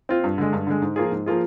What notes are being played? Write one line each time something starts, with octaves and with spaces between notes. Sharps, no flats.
C4 F4
G2
D3 G#3
G2
D3 G#3
G#2
F3 A#3 F4 G#4
G#2
F3 A#3 F4 G#4